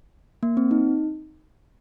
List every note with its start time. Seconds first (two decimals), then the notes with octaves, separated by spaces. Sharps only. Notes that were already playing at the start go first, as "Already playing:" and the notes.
0.43 A#3
0.57 C4
0.71 D#4